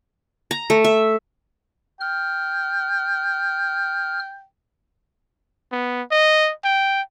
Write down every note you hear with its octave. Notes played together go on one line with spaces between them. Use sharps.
A#5
A3
E5
G5 F6
B3
D#5
G5